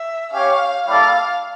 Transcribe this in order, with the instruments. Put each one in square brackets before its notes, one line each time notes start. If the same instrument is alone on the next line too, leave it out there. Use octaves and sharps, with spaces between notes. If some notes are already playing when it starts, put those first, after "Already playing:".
Already playing: [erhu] E5
[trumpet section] C#4 G4 C#5 [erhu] F5
[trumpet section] G3 A#3 E4 A4 D5 [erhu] F5